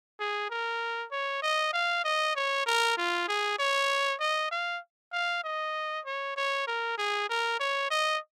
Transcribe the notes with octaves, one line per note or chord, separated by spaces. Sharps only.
G#4
A#4
C#5
D#5
F5
D#5
C#5
A#4
F4
G#4
C#5
D#5
F5
F5
D#5
C#5
C#5
A#4
G#4
A#4
C#5
D#5